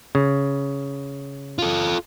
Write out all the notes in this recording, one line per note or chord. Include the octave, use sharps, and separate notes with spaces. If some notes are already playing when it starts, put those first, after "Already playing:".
C#3
F4 A4